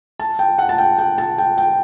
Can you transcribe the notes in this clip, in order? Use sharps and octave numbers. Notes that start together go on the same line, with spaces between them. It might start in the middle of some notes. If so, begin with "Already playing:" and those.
A5
G5
F#5
A5
G5
G5
A5
G5
G5